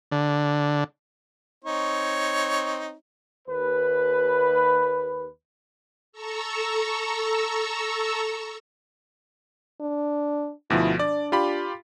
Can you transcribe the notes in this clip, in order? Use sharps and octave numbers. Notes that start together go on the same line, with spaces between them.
D3
C4 D#4 C#5
D#2 B4
A4 A#5 C#6 E6
D4
D2 B2 F3 E4
D4 D5
F4 G4 B5